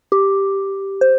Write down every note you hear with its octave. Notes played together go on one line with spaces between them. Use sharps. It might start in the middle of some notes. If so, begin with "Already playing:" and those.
G4
C5